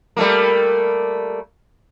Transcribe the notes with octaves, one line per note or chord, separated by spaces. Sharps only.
G3 A3 A#3